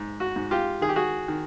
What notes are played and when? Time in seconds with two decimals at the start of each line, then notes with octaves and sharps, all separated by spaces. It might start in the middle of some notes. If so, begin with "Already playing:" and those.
Already playing: G#2
0.20 F#4
0.36 G#2
0.51 F4 G4
0.81 D#3 G#4
0.89 G4
0.96 F#4 G#4
1.28 D#3